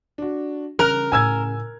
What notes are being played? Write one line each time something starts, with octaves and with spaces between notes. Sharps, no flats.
D4 F#4
C#3 E3 G3 A#4 F#6
A2 G#5 E6 G#6